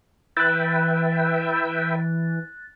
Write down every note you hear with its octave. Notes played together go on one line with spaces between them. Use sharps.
E3 B4 E5 G5 F#6 A6